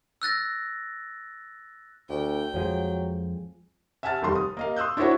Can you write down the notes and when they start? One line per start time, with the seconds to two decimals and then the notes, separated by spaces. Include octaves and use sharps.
0.22 E6 F#6 A6 A#6
2.09 D2 G5
2.54 F2 F3 F#3 G#3
4.03 E5 F#5 G#5 A5 F6 A6
4.22 F1 D#2 G3 C6
4.35 D#6
4.57 A#3 D#5 F5
4.76 C6 D#6 E6 F#6 G6
4.97 D4 E4 F#4 C5 C#5 F#5